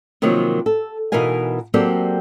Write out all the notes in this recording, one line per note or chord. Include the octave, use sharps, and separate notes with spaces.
C3 D#3 F3 F#3 A#3 C4
A4
B2 E3 D#4 A#4 F5 G#5
F#3 A#3 C4 G4 A4 D5